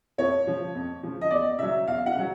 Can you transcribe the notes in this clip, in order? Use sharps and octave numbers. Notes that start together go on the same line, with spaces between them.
F2 C#5
C#3 F3
F2
C#3 F3
D#5
E2 D5
C#3 F#3 E5
E2 F5
F#5
C#3 F#3